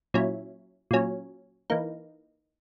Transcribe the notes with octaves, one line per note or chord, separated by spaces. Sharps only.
A#2 F#3 C#4 E4
A#2 F#3 C#4
E3 A#3 D#4